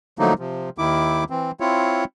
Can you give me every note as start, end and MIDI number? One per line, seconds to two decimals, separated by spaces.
0.19 0.34 50
0.19 0.34 53
0.19 0.34 54
0.19 0.34 57
0.19 0.34 58
0.19 0.34 63
0.39 0.69 48
0.39 0.69 53
0.78 1.24 39
0.78 1.24 51
0.78 1.24 64
0.78 1.24 86
1.30 1.51 52
1.30 1.51 60
1.60 2.04 60
1.60 2.04 64
1.60 2.04 65
1.60 2.04 73